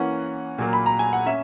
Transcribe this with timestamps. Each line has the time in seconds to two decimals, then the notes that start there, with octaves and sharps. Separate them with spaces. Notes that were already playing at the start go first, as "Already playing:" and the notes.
Already playing: E3 A#3 C#4 F#5
0.58 A#2 F#3 A#3
0.73 B5
0.86 A#5
0.99 G#5
1.13 F#5
1.26 C#4 E5